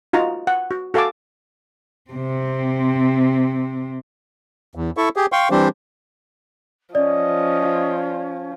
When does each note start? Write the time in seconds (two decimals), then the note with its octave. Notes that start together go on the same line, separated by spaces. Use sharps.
0.13 D#4 F4 F#4 A#5
0.47 F#5
0.71 F#4
0.94 F#4 A4 F5 G#5 A5 D6
2.11 C3 C4
4.75 E2
4.97 E4 A4 C#6
5.16 G4 G#4
5.32 F5 G5 C6 C#6
5.51 E3 G3 C4 D4 G4 C5
6.95 F3 C#4 D5 D#5